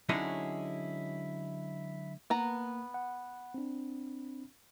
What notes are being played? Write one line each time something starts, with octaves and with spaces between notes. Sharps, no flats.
D3 F#3 G#3 C#4 D#4 E4
A#3 B3 A#5
F#5
C4 D4